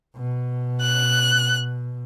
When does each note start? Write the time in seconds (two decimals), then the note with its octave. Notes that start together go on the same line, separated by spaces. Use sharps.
0.16 B2
0.82 F#6